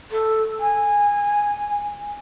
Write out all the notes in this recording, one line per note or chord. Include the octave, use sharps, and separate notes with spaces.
A4
G#5